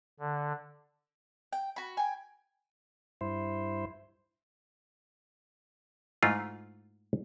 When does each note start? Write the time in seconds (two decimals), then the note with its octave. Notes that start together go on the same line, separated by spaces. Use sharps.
0.20 D3
1.53 G5
1.76 F#4 B5
1.97 G5 G#5
3.21 G2 E4 C5
6.23 G#2 A3 E4 F4 D#5